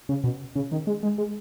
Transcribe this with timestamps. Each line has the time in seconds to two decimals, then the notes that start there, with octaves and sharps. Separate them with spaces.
0.09 C#3
0.24 B2
0.56 C#3
0.72 D#3
0.87 G#3
1.03 G#3
1.18 G#3